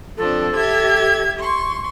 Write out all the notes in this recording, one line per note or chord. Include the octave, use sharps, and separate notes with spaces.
F3 C4 D4 A4
G4 E5 G#6
C6 C#6